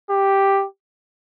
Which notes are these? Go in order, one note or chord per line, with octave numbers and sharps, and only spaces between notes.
G4